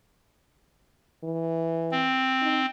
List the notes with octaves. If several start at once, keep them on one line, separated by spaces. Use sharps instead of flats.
E3
C4
D#4